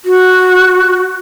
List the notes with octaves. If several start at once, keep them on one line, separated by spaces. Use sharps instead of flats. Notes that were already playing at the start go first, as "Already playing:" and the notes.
F#4